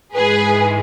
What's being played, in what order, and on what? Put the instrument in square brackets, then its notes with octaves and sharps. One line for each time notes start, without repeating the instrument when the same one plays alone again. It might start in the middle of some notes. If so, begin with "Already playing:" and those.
[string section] G#2 E3 G#3 G#4 B4